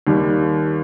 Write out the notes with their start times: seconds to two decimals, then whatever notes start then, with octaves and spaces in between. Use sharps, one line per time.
0.07 D#2 D#3 G3